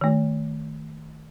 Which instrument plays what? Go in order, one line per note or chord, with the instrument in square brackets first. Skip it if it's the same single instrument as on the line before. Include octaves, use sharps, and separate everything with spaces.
[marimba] D#3 A3